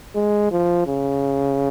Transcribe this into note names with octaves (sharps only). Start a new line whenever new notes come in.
G#3
F3
C#3